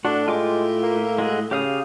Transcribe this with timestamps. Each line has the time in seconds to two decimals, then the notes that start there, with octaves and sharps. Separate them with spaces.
0.05 A2 D4 F#4
0.28 G#3 F4 G5 D6
0.83 A#3
1.18 G#3 F#4 G#4
1.51 C#3 G4 F5 D#6